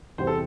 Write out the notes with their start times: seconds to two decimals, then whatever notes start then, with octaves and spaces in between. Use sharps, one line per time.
0.18 E2 C3 G3 C4 C5
0.27 A4